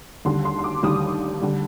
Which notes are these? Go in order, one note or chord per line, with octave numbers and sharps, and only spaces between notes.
D#2 D3 G3 C6
C6
C6
D6
D#2 D3 G3 D#6
D3 G3